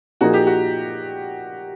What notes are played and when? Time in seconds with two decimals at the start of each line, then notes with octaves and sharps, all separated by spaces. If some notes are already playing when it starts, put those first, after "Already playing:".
0.21 A#2 F3 A#3 D#4 F#4 G#4
0.34 G4
0.47 F#4